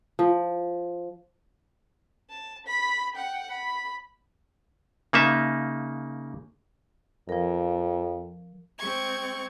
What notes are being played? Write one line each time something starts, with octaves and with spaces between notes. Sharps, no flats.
F3
A5
B5 B6
F#5 G5
B5
C#3 A#3 D#4 E5 A5
F2 F3 A#4
G#3 C4 C#6 G#6